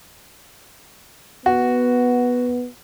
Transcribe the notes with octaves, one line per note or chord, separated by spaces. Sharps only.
B3 F#4